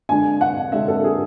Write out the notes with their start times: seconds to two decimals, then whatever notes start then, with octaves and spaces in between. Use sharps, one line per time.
0.09 D3 G#3 D4 G#5
0.41 F#5
0.72 D3 G#3 D4 E5
0.88 A4
1.04 G#4